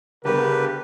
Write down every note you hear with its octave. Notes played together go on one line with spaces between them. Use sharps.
D2 C#3 G3 B3 G4 A#4 B4